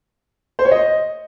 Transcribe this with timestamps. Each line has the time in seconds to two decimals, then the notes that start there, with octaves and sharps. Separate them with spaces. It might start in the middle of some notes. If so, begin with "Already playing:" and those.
0.59 C5
0.65 C#5
0.71 D#5